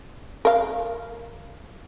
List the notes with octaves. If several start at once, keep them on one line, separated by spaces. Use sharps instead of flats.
A#4 F5